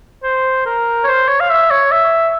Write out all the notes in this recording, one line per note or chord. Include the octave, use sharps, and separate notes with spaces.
C5
A#4
C#5
C5
C#5
F5
E5
C#5
E5